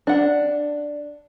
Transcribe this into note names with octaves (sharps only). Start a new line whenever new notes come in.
D4 F#5